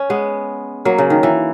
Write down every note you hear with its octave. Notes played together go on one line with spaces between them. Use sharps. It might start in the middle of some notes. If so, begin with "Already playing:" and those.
Already playing: C#4
G#3 B3
F#3 A#3
C#3
D#3
E3